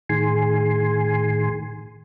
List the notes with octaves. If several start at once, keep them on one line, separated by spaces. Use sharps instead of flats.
A2 D#3 G#4 G#5 C6